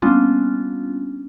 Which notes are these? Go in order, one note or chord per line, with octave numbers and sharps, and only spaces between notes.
G3 A#3 B3 C#4 D4 F4